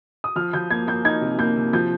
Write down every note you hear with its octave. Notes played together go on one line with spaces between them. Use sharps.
D#6
F3 F6
F3 G6
A#3 G#6
A#3 G6
D#4 G#6
C3
A#3 G6
C3
F3 G6